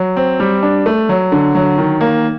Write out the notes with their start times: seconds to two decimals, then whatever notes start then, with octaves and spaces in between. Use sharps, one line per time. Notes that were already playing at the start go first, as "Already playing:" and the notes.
Already playing: F#3
0.16 C4
0.40 G3
0.63 D4
0.86 A3
1.09 F#3
1.32 D3
1.55 F#3
1.78 D#3
2.01 A#3